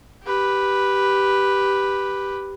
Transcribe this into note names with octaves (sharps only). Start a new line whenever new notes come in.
G4 B4